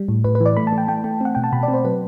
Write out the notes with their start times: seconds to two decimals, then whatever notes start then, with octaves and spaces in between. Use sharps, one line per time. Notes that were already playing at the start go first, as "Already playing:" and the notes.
Already playing: G3
0.09 A2
0.24 A2 B4
0.35 B4
0.40 E3
0.46 D5
0.57 A3 B5
0.67 A5
0.73 A3
0.78 G5
0.88 A3 G5
1.04 A3
1.21 C4 F#5
1.35 B2 G5
1.44 A5
1.52 B2 B5
1.63 D5
1.68 C4
1.74 C5
1.85 F#3 B4